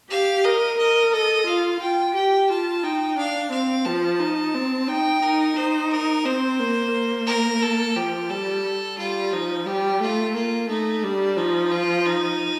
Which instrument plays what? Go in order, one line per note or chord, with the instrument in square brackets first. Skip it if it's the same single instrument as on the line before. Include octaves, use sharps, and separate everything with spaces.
[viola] G4 [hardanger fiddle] F5
[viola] A#4 [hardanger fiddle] D#5
[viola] A#4 [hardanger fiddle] D#5
[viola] A4 [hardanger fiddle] D#5
[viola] F4 [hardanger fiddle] F5
[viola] F4 [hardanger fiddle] G5
[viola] G4 [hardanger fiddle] G5
[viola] F4 [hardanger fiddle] A5
[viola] D#4 [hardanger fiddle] G5
[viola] D4 [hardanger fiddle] F5
[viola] C4 [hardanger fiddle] F5
[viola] F3 [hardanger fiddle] A5
[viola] D#4
C4
[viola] D#4 [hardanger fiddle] G5
[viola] D#4 [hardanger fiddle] A#4
[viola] D#4 [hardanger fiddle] C5
[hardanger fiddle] A#4
[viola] C4 [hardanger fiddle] C5
[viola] A#3
A#3
[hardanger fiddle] A#4
A4
[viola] F3 [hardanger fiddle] G4
[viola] G3 [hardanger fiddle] A4
[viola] G3 [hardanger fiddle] F4
[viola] F3 [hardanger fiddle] D#4
[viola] G3 [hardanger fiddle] G4
[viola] A3 [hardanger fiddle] F4
[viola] A#3 [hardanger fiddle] F4
[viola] A3 [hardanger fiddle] D#4
[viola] G3 [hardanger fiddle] D4
[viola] F3 [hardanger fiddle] D#4
[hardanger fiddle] F4
D#4